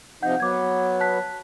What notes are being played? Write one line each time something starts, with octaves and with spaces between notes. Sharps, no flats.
C3 F3 D#4 F#5 G6
F#3 B3 D6 G#6
A5 F#6 B6